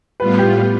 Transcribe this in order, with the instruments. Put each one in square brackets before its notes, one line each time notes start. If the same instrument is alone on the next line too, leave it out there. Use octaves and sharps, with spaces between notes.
[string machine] A2 G3 B3 F4 [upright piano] B4
[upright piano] G4